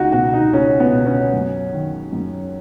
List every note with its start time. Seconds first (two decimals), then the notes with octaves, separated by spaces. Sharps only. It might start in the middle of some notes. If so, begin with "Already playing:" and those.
Already playing: C#2 D#4 F#4
0.12 B2 F#4
0.34 D#4
0.53 C#2 C#4
0.80 B3
0.92 B2
1.07 C#4
1.34 F#2
1.72 D#3
2.13 F#2